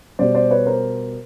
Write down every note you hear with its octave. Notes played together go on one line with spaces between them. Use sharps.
B2 G3 C5 D5
C5 D5
B4 C#5
A#4 C5